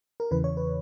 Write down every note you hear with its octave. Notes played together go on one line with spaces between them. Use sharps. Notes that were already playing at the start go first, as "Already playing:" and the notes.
A#4
E2 C#3 E3 B4
C#5
B4